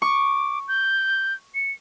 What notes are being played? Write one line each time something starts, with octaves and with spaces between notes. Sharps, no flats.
C#6 D6
G6
C#7